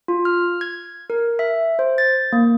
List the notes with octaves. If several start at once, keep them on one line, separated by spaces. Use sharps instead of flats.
F4
F6
G#6
A#4
E5
C5
A6
A#3